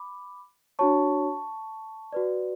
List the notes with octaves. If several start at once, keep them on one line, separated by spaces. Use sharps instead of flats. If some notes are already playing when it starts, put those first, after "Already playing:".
Already playing: B5 D6
D4 F#4 C#5 A5 C#6
F#4 B4 D5